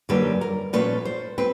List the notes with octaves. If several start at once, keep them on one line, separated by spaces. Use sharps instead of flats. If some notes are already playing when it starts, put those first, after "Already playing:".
F#2 D3 G3 A#3 B4
A#4
A#2 F3 A3 C#4 B4
C5
C4 B4